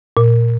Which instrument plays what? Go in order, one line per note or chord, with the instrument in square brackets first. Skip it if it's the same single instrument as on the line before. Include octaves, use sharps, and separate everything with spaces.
[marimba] A#2